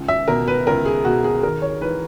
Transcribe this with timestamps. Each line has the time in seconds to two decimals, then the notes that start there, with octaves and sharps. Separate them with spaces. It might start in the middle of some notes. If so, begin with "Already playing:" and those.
Already playing: C#2
0.08 E5
0.28 B2 A#4
0.48 B4
0.67 C#2 A#4
0.85 G#4
1.05 B2 F#4
1.24 G#4
1.43 G#1 A#4
1.62 C#5
1.81 G#2 E3 B4